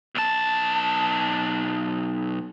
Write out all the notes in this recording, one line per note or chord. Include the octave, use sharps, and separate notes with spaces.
B1 A5